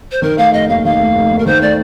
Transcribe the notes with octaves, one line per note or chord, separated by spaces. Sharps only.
C5
D#3 A#4
A3 F5
F1 D#5
D#2 F5
D#3 F5
A3
F1
D#2
A#4
D#3 C5
A3 D5